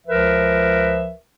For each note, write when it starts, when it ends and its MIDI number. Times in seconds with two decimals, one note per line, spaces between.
0.07 1.13 37
0.07 1.13 53
0.07 1.13 70
0.07 1.13 71
0.07 1.13 76